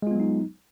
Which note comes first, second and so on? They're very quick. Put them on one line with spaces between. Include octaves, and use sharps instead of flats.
G#3 F4 B3 F#3 D#4